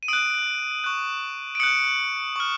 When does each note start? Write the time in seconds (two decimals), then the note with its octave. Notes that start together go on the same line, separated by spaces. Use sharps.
0.03 D#7
0.08 D#6 F#6 D7
0.84 C#6 F#6
1.55 D7
1.60 D#6 F#6 C#7
2.36 C#6 F6